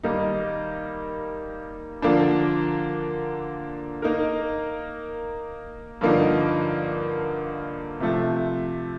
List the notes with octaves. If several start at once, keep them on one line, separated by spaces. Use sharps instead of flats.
D#3 G3 A#3 D#4
D3 F3 A#3 D4
A#3 D#4 A#4
G2 D3 F3 A#3 D#4
C3 F3 A3